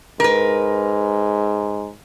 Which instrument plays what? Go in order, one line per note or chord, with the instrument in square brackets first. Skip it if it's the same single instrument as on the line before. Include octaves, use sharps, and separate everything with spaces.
[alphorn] G#2 [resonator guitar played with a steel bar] A#4 B4